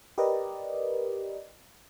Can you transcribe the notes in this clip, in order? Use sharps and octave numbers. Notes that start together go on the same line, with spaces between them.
G4 A#4 B4 D5 D#5